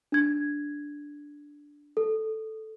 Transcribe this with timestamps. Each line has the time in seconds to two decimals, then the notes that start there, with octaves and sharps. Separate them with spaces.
0.12 D4 G#6
1.97 A4